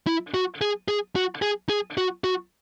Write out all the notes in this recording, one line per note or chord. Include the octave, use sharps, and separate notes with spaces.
E4
F#4
G#4
G#4
F#4
G#4
G#4
F#4
F#4